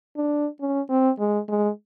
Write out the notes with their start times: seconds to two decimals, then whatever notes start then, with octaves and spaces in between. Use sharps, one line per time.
0.17 D4
0.60 C#4
0.90 C4
1.19 G#3
1.49 G#3